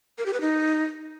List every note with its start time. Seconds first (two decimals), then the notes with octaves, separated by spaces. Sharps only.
0.18 A#4
0.26 G4
0.33 B4
0.41 D#4